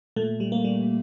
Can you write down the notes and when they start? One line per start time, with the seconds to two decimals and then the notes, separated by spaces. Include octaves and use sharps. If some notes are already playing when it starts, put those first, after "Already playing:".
0.16 A#2 A3
0.40 G3
0.52 A#3
0.64 G3